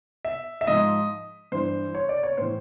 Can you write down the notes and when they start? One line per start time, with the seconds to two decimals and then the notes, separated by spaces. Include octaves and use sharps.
0.25 E5
0.61 E5
0.67 G#2 F3 D#5
1.52 G2 E3 C5
1.95 C#5
2.09 D5
2.23 C#5
2.37 A2 E3 C5